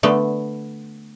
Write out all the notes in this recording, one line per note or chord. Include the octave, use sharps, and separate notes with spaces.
D3 A3 B3